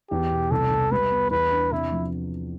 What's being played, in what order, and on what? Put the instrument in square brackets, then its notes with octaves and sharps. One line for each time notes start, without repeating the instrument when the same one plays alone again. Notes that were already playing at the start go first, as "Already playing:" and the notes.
[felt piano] E2 [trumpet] G4
[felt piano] B2
[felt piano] C2 [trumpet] A4
[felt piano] C2
[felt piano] G3 [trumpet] B4
[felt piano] B3
[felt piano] E2 [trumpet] B4
[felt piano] D4
[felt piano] C3 [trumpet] E4
[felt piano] F3